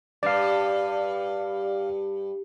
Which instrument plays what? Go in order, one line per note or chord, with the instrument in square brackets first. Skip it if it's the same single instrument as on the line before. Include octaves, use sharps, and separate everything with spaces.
[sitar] G2 [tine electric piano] D5 F5